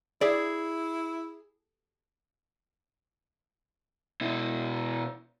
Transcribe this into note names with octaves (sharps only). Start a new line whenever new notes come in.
E4 G#4 D5 E5
B2 E4